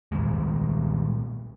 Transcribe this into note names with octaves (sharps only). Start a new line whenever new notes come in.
A#2 D#3 G3 G#3